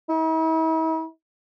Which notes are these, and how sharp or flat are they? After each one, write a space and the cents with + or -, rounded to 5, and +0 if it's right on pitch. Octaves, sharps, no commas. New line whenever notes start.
E4 -45